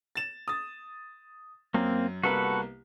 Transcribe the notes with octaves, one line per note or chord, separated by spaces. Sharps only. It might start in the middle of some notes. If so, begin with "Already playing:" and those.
A6 E7
D#6 A6
F#2 A#3 C4
C2 A#3 B3 F#4 A4 B4